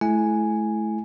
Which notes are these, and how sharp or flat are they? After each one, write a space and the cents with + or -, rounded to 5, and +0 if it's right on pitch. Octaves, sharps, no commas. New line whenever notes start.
A3 -30 E4 +0 G#5 +0